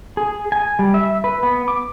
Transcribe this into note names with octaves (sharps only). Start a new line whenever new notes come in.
G#4
G#5
G3
E5
B4
B3
D6